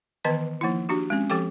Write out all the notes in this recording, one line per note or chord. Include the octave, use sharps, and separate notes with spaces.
D#3 E3 B3 B4 D#5 A5
F3 A#3 D#4 E4
D4 F#4 G4
G#3 C4 C#4
F3 C4 G4 A4 G5 D6